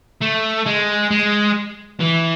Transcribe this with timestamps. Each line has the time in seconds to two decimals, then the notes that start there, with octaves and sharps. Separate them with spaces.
0.21 A3
0.66 G#3
1.11 G#3
2.01 E3